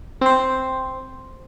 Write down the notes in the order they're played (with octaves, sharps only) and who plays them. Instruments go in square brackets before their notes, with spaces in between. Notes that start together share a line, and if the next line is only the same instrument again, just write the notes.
[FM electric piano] C4 C5